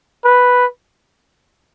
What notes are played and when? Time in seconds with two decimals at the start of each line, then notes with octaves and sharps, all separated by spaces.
0.25 B4